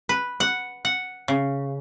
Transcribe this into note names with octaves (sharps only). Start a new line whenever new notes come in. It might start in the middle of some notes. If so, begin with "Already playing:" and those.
B4
F#5
F#5
C#3